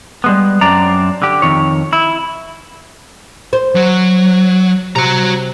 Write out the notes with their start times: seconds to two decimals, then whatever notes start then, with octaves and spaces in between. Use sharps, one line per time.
0.24 G3 G#3 B3
0.61 F#2 C4 D4 D5 A#5
1.22 D3 G4
1.42 F2 D#3 C#5
1.93 E4
3.53 C5
3.75 F#3
4.96 C3 F#4 A#5